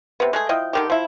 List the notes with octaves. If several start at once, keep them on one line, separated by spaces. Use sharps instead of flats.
C3 B3
G#3 A3 G#4
F3 E4 D#5 G5
D3 D#3 G4
F3 E4